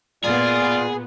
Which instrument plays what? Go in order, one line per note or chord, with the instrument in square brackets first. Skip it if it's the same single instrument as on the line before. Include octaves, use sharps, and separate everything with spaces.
[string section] A#2 B3 [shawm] F4 [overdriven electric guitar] G#4 [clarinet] D5